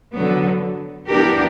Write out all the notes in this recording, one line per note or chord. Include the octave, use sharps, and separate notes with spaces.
D3 F#3 B3
E3 B3 D4 G4 A#4